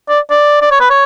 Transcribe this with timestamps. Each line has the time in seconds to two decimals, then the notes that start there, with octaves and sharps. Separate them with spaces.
0.09 D5
0.30 D5
0.62 D5
0.71 C#5
0.80 B4
0.90 C#5